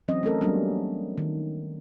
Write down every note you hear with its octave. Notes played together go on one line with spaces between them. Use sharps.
E3 F#3 C4 C#4 D#5
A3 C#4 A4 A#4
F#3 G3 A#3 B3 C#4 D4
D#3